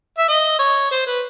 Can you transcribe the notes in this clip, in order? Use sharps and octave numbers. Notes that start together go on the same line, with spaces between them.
E5
D#5
C#5
C5
B4